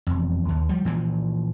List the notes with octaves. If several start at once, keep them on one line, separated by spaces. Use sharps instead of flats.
E1 F2
D#2
F3 G3
A#2 E3 F3